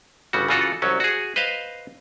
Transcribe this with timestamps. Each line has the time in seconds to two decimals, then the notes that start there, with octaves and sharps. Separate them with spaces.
0.33 G1 C#3 G3 F#4
0.48 C#3 E3 F4 F#4 A4
0.82 C2 F#3 C#4
1.00 F#4 G#4
1.36 B4 C5 D#5 F5